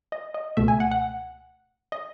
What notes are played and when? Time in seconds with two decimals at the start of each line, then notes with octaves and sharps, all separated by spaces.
0.12 D#5
0.34 D#5
0.57 C#2 B2 A3 E5
0.68 G#5
0.80 F#5
0.92 F#5
1.92 D#5